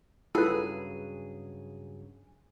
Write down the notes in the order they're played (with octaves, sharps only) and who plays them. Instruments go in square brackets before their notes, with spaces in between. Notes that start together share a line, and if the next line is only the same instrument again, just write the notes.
[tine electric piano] G2 C#3 F#3 [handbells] E4 F4 [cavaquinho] G#4 [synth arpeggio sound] A4 B4